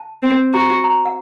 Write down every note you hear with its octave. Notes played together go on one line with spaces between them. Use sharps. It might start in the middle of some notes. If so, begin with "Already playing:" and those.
Already playing: A5
C4
F#4 A#5
A#5
F#5